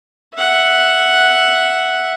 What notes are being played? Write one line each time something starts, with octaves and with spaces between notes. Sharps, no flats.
E5 F#5